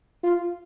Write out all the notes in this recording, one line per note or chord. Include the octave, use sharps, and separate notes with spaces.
F4